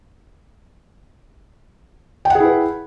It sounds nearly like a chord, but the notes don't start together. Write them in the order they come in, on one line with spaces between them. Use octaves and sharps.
G5 F#5 G#4 E4 B4